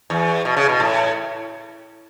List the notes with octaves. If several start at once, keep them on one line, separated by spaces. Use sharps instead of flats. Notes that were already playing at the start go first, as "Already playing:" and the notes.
E2
B2
C#3
B2
A2